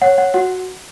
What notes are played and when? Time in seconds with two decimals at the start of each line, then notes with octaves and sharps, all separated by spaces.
0.02 C#5 F#5
0.18 F#5
0.34 F#4 F#5